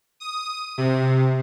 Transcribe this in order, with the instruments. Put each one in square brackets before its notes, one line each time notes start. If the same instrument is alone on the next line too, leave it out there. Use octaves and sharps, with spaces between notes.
[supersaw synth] D#6
C3